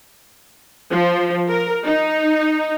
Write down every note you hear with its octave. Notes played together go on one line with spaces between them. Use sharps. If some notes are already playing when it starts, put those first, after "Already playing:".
F3
A#4
D#4